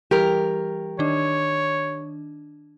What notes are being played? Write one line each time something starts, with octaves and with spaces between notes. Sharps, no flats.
E3 G3 G4 A#4
D#3 D4 C#5